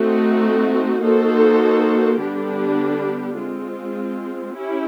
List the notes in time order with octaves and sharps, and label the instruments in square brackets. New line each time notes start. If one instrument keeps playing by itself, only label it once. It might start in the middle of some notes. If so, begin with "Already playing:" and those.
Already playing: [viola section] A3 C4 D#4 F#4
A#3 D#4 F#4 A4 C5
D3 G3 B3 D4 G4
G#3 C4 F4
C#4 E4 G4